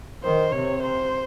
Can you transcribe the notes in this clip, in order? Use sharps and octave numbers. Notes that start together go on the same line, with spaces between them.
D#3 C5
C3 C#5
C5